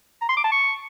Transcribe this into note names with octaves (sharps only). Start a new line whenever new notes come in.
A#5
C6
D6
A5
C#6